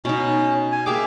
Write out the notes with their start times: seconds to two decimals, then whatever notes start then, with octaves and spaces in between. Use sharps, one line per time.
0.05 B2 C#4 D#4
0.72 G#5
0.86 A#3 G4 G#4 E5 D6